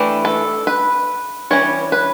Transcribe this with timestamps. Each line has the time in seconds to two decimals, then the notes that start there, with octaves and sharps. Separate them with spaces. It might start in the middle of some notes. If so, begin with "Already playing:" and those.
Already playing: E3 A3 D4 G4
0.25 A4
0.67 B4
1.51 E3 G3 C#4 C#5
1.92 B4